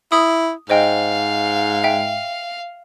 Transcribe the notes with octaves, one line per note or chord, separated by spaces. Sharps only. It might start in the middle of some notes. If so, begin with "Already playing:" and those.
E4 D#6
G#2 C5 D#5 F5 G5
E5 G5